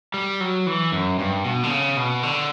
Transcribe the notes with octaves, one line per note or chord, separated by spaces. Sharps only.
G3
F#3
E3
F#2
G2
B2
D3
C#3
B2
D3